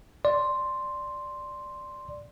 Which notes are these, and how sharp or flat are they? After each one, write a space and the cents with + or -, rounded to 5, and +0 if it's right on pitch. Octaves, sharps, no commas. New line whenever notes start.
D5 +0 C6 +0